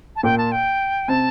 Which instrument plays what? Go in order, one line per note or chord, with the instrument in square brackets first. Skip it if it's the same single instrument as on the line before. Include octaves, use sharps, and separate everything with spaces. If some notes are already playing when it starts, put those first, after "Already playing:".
[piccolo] A5
[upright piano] A#2 A#3 [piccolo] G5
[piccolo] A5
G5
[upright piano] C3 C4 [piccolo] A5